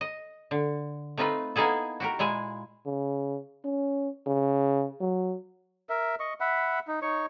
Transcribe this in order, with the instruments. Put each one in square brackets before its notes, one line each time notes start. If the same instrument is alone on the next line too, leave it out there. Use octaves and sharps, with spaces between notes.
[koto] D#5
D3
A3 C4 D#4 F4 B4
A#3 B3 D#4 E4 G#4 A4
F#4 G4 A#4
A#2 G#3 E4 G#5
[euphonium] C#3
C#4
C#3
F#3
[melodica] A#4 E5
D#5 C#6
E5 F#5 B5
D#4
D#4 C#5 C#6